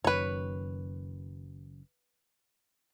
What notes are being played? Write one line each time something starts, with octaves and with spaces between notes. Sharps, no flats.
F#1 F#2 D#3 B4 C#5